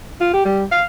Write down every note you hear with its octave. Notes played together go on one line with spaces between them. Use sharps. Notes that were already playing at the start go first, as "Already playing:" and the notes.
F4
G4
G3
F5